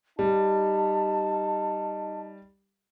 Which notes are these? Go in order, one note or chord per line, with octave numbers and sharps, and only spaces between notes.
G3 D#4 A5